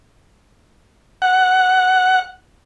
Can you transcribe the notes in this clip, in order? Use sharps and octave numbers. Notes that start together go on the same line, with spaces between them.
F#5